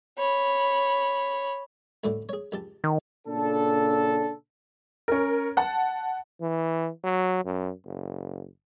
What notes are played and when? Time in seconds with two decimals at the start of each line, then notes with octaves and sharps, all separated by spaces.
0.18 C#5 B5
2.04 D2 A2 D3
2.29 G#4 C#5
2.52 C#2 G4 A5
2.84 D#3
3.27 A#2 C#3 D4 A4
5.08 C#4 A#4
5.57 F#5 A5
6.41 E3
7.04 F#3
7.45 F#2
7.85 F#1